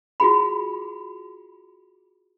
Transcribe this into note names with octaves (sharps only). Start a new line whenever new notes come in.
F4 F#4 G#4 B5